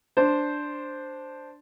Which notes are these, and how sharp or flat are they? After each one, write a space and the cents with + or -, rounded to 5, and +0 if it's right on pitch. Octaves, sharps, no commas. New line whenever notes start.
D4 +0 C5 +0